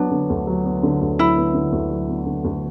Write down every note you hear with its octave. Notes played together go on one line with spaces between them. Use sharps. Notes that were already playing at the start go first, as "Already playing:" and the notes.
Already playing: F#3 B3 D4
D3
D2
F#3
B3
D3
D2
F#3 E4
B3
D3
D2
F#3
B3
D3
D2